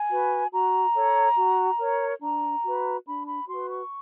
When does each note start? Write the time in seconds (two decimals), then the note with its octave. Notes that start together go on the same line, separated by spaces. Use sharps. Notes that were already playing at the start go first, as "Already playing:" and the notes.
Already playing: G#5
0.10 F#4 B4
0.52 F#4 A#5
0.94 A4 C#5
1.36 F#4
1.79 A#4 C#5
2.21 D4 A#5
2.63 F#4 B4
3.06 D4 B5
3.27 B5
3.48 F#4 B4 C6
3.69 C#6